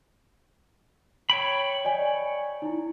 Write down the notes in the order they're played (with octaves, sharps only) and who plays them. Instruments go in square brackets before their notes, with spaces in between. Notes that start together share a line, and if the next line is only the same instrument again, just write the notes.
[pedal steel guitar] C#5 G5 B5
[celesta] D5 D#5 G#5
D#4 E4